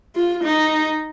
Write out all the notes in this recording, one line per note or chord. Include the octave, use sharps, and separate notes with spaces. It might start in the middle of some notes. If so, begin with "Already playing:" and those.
F4
D#4